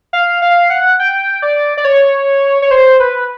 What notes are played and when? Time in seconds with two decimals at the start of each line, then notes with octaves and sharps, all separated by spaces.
0.13 F5
0.42 F5
0.70 F#5
1.00 G5
1.42 D5
1.77 D5
1.85 C#5
2.62 C#5
2.71 C5
3.00 B4